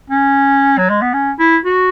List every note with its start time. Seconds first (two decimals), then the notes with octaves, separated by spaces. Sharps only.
0.10 C#4
0.78 F#3
0.90 G#3
1.02 B3
1.13 C#4
1.39 E4
1.65 F#4